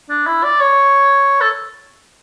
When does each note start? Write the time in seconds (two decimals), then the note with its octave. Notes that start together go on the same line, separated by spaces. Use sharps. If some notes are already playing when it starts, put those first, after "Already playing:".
0.09 D4
0.27 E4
0.43 D5
0.61 C#5
1.41 A4